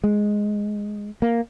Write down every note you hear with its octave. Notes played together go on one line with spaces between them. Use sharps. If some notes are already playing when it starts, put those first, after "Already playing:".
G#3
A#3